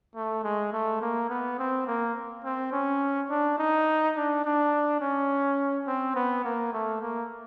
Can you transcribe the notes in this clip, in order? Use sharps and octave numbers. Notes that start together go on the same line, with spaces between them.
A3
G#3
A3
A#3
B3
C4
A#3
C4
C#4
D4
D#4
D4
D4
C#4
C4
B3
A#3
A3
A#3